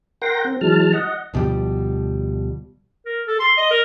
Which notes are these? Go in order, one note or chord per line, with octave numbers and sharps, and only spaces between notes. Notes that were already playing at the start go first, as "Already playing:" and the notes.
A#4 F#5 G5 C6 A#6
C4
E3 F#3 G#3 A5 F6
D#5 F#5
D2 B2 F3 G3
A#4
A4
C6
D#5
A#4